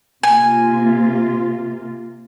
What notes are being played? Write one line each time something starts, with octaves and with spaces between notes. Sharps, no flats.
C3 A#3 F4 G#5